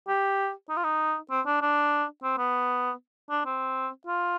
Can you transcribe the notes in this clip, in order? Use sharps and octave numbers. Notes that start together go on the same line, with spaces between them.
G4
D#4
F4
D#4
C4
D4
D4
C4
B3
D4
C4
F4